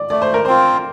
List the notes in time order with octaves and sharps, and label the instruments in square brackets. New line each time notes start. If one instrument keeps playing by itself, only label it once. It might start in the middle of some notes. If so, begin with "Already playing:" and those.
Already playing: [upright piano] D5
[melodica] A3 [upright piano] D5
[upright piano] C5
A#4
[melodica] C4 F4 [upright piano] C5